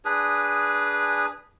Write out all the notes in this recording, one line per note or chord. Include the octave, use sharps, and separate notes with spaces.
D4 G#4 B4 D#6